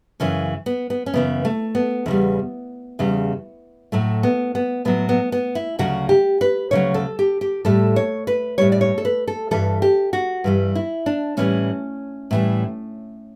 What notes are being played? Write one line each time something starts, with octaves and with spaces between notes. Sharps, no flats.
F#2 C#3 E3 C#4
B3
B3
C#4
F#2 C#3 E3 B3
A3
B3
E2 C#3 G3
E2 C#3 G3
A2 F#3 A3
B3
B3
A2 F#3 B3
B3
B3
E4
D2 C#3 F#3 F#4
G4
B4
D2 C#3 F#3 C#5
A4
G4
G4
A2 G3 A4
C#5
B4
A2 G3 C#5
D5
C#5
A4
B4
A4
G2 E3 G3 A4
G4
F#4
G2 E3 G3
E4
D4
A2 E3 G3 C#4
A2 E3 G3